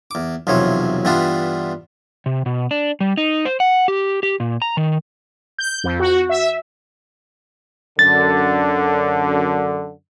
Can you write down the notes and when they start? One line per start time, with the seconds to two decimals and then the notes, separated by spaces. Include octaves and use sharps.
0.11 E2 D6
0.47 B1 E2 C3 F3 C#5
1.05 G2 E3 G3 B3 D4 F4
2.26 C3
2.46 B2
2.71 D4
3.00 G3
3.17 D#4
3.45 C5
3.60 F#5
3.88 G4
4.23 G4
4.40 A#2
4.62 A#5
4.77 D#3
5.58 G6
5.84 F2
6.00 F#4
6.29 E5
7.99 F#2 D3 A6